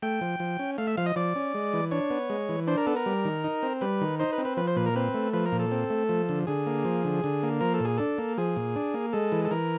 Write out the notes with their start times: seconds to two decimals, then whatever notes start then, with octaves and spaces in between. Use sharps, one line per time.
0.02 A3 G5
0.21 F3
0.40 F3
0.59 C#4
0.78 A3 F5
0.87 E5
0.97 F3 F5
1.06 D#5
1.16 F3 D5
1.36 C#4
1.54 G#3
1.73 E3
1.91 D4 C#5
2.10 B3
2.30 G#3
2.49 E3
2.67 D4 C5
2.77 A#4
2.86 B3 A4
2.96 A#4
3.06 G3
3.25 D#3
3.44 D#4
3.63 C4
3.81 G3 B4
4.01 D#3
4.19 D#4 C5
4.33 B4
4.38 C4
4.45 B4
4.57 F3 B4
4.67 C5
4.76 A#2 B4
4.86 A#4
4.96 C4 B4
5.14 A3
5.33 F3 B4
5.46 A#4
5.52 A#2
5.60 A4
5.72 C4
5.90 A3
6.09 F3
6.29 D3
6.47 D3 G#4
6.66 A#3
6.85 F3
7.05 D3
7.24 D3
7.43 A#3
7.61 F3 A#4
7.74 A4
7.80 A#2 G#4
7.98 D4 A4
8.18 A#3
8.38 F3 G#4
8.56 A#2
8.76 D4
8.94 A#3
9.13 G#3 A4
9.32 E3
9.45 A4
9.51 E3 A#4